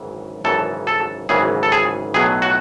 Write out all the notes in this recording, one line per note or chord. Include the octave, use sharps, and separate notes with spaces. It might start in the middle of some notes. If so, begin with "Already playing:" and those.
Already playing: G#1 F#2 C#3 E3
G#1 F#2 C#3 E3 A4
A4
G#1 F#2 C#3 E3 G#4
A4
G#4
B1 A2 F#3 G#4
F#4